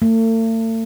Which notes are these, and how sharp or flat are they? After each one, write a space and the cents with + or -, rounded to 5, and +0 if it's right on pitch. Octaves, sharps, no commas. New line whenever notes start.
A3 +40